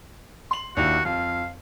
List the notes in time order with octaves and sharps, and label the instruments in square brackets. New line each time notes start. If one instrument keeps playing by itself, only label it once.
[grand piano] C6 F#7
[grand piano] D#2 D4 E4 [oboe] F#4
[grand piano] F2 [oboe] F5